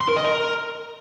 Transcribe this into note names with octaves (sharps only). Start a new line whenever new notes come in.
C6
A#4
D#5
A#4